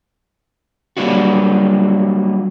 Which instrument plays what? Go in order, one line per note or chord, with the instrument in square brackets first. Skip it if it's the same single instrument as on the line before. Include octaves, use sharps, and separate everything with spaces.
[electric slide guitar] F#3 G3 A#3 D4 F4 F#4